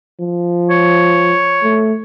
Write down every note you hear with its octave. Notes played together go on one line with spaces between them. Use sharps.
F3
C#5
A3